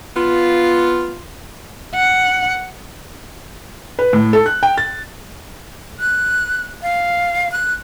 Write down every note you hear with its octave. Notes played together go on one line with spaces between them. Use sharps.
B3 F4
F#5
B4
A2
A4
F#6
G5
A6
F#6
F5
F#6